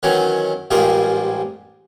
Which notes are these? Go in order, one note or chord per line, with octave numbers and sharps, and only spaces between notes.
D#3 E3 F#3 C#4
A1 G#2 G3 F4 G#4 A#4